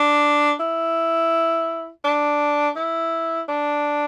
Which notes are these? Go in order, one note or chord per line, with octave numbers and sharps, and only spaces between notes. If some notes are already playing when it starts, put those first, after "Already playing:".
Already playing: D4
E4
D4
E4
D4